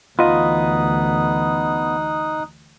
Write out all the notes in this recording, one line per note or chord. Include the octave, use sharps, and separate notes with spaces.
D2 E3 B3 D#4 F4 D#5 D#6 F#6